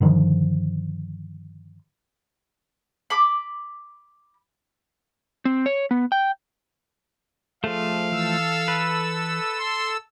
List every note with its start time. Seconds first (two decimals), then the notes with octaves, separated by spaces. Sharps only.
0.01 G2 D3 D#3 F3
3.10 B5 D6
5.45 C4
5.66 C#5
5.91 B3
6.12 G5
7.64 F3 A3 G#4 A4 C5 F5
8.12 E3 A4 E6
8.68 B4
9.60 C6